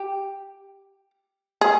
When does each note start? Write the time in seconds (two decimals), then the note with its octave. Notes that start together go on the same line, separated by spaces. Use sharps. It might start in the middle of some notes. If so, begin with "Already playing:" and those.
Already playing: G4
1.61 G#4